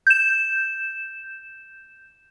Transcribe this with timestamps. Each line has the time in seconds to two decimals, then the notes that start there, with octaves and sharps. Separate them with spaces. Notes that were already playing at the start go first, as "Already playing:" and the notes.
0.07 G6 E7